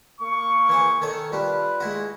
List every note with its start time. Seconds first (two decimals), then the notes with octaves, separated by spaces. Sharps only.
0.19 A#3 C#6
0.69 E3 G#4 C5
1.02 D#3 A4 C#5
1.32 G3 D4 F4 B4
1.80 G#3 E4 F#4